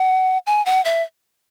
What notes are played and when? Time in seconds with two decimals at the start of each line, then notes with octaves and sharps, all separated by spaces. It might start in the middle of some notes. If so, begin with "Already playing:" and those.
Already playing: F#5
0.47 G#5
0.66 F#5
0.85 E5